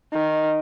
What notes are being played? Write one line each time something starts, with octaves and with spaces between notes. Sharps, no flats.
D#3